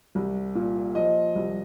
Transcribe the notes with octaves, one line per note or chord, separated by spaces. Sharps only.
C2
A#2
F3 D#5
C2